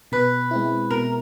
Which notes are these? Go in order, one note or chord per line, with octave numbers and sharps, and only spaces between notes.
B2 B4
G#3 C4 E4
B2 A#4